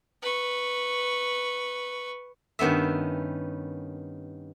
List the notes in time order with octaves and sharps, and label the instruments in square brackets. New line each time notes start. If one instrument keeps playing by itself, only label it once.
[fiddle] B4 C#6
[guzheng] G2 D#3 B3 C#4 E5